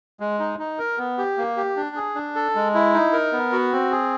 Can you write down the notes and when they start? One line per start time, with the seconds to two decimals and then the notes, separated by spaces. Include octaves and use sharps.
0.20 G#3
0.39 D#4
0.59 D#4
0.79 A#4
0.98 B3
1.18 G4
1.37 A#3
1.57 G4
1.76 D4
1.96 G#4
2.15 D4
2.35 A4
2.55 G#3
2.74 E4
2.94 D#4
3.13 A#4
3.32 B3
3.52 F#4
3.72 C4
3.91 G#4